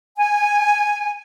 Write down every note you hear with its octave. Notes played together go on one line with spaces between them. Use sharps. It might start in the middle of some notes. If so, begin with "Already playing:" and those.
G#5